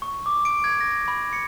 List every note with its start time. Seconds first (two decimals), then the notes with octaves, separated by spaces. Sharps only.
0.02 C#6
0.26 D6
0.45 D7
0.64 G#6
0.81 A#6
1.08 B5
1.33 C#7